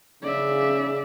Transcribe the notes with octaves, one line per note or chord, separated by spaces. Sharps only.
C#3 D5 E5